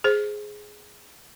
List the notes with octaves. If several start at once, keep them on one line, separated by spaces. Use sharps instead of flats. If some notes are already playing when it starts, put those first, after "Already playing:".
G#4 C5